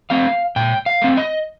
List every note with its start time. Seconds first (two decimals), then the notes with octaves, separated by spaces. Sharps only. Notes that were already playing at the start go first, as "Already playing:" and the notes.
0.10 A3 C4 F5
0.56 A#2 G5
0.86 F5
1.02 A3 C4
1.17 D#5